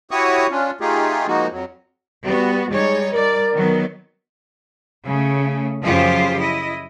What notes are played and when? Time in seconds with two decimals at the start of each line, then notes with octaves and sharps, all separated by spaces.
0.11 E4 F#4 G4 C#5 C#6 D#6
0.51 C#4 D4 F4
0.81 A3 D#4 F4 G4 G#4
1.27 F3 G#3 A#3 D#4 F#4
1.52 F2 F#3
2.26 G3 B3 F#4
2.71 G3 G#3 D#4 C#5
3.13 G3 A#4 D5
3.54 D#3 F#3 B3
5.05 C#3 A3
5.82 F#2 C#3 F3 F4 G4 C5
6.38 E4 D#5